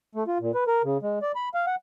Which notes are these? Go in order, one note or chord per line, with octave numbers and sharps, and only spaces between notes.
A3
F4
A#2
B4
A#4
C#3
G#3
D5
B5
F5
F#5